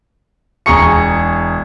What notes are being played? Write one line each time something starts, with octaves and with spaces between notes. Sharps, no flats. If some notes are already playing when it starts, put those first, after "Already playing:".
E1 G#4 A#5 C#6 C#7